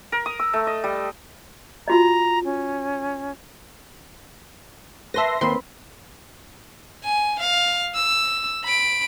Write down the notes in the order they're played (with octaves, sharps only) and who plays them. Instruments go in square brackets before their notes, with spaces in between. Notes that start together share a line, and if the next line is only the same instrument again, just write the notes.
[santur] A#4
D#6
E6
A3
D#5
G3
[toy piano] F4 F#4 D#5 [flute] A#5
[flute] C#4
[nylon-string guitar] B4 A5 [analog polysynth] E5 C6 A#6
[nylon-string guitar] D#2 [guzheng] C4 B4 [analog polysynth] C6
[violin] G#5
F5
E6
B5 D7